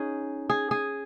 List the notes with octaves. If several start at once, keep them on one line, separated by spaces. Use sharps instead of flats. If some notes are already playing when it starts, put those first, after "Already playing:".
Already playing: C#4 D#4 G#4
G#4
G#4